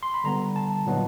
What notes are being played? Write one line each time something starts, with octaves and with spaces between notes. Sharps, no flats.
C6
B5
D3 G3 B3 A#5
A5
A#2 F#3 B3 D#4